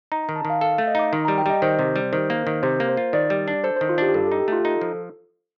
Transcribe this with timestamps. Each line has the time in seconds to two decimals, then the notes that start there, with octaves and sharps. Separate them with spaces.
0.12 D#4 A#5
0.23 A#5
0.29 D#3
0.36 A5
0.45 D#3
0.50 F5
0.61 A4 F5
0.75 A3 F5
0.87 D#5
0.95 D#4 D6
1.12 D#3 C6
1.25 G3 A#5
1.38 G5
1.46 G3 D#5
1.62 D#3 C5
1.79 C3
1.96 G3
2.13 D#3 C5
2.30 A#3
2.47 D#3
2.63 C3 C5
2.80 A#3
2.88 C5
2.97 F4
3.13 D#3 D5
3.30 G3
3.48 D4
3.64 A4 C5
3.76 D#3 C5
3.89 F4
3.98 D4 G4
4.08 G4
4.14 G2 A4
4.27 D#4 A4
4.39 G4
4.48 A3 F4
4.65 D#4 A4
4.81 F3